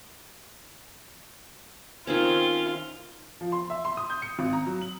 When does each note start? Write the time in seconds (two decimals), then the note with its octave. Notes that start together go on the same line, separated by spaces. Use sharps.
2.07 D#3 C4 C#4 F4
3.41 F3
3.52 C6
3.70 E5
3.85 C6
3.97 D#6
4.10 G6
4.22 C#7
4.39 G#1
4.53 A#5
4.67 F#3
4.82 F#7